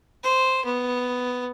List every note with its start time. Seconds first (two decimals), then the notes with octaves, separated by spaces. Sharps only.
0.24 C5
0.65 B3